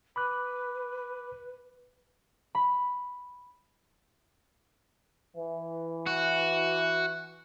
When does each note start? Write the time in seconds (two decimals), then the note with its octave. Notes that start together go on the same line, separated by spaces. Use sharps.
0.16 B4 B5 D6 F#6
2.55 B5
5.36 E3
6.06 F#4